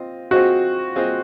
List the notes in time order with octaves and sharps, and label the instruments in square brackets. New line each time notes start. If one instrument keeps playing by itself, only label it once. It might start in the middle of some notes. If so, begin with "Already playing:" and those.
Already playing: [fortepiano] C4 F4 D#5
[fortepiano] C4 F4 G#4 C5 D#5 [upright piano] F#4
[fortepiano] C4 F4 G#4 C5 D#5